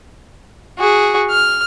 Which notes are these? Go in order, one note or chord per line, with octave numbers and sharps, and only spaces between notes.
F#4 G#4
F6